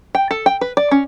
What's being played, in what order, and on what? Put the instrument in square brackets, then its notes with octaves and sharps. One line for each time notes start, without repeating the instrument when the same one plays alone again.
[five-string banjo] G5
A4
G5
B4
D5
C#4